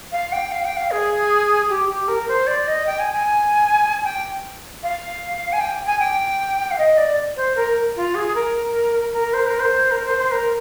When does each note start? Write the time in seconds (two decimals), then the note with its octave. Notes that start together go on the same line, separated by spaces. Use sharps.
0.12 F5
0.32 G5
0.51 F5
0.64 G5
0.76 F5
0.91 G#4
1.69 G4
1.89 G4
2.08 A#4
2.28 C5
2.47 D5
2.67 D#5
2.86 G5
2.99 G#5
3.12 G#5
4.04 G5
4.83 F5
5.52 G#5
5.60 G5
5.86 G#5
5.99 G5
6.70 F5
6.78 D#5
6.97 D5
7.36 C5
7.56 A#4
7.96 F4
8.14 G#4
8.35 A#4
9.12 A#4
9.33 C5
9.46 A#4
9.59 C5
9.91 A#4
10.05 C5
10.18 C5
10.31 A#4